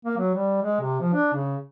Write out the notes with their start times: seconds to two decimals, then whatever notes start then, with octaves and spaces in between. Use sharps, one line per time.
0.05 A#3
0.18 F#3
0.34 G3
0.63 G#3
0.80 C3
1.00 F3
1.13 D4
1.34 C#3